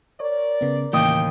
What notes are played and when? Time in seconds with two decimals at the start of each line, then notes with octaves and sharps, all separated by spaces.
0.20 A#4 C#5 D5
0.61 C#3 B3
0.93 D#2 A2 C#3 E3 G5 D#6